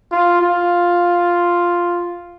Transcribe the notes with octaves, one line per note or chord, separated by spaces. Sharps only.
F4
F4